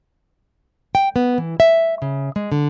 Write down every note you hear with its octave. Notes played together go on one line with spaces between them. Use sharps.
G5
B3
E3
E5
C#3
G#3
D3